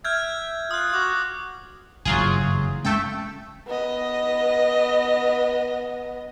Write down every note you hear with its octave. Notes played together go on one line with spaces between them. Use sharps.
E5 F6 G6 G#6
F4 D#6 F#6
F#4 D6
F#1 G2 E3 F#3 F4 G#4
G#3 A3 C#4 A4 G5
B3 D#5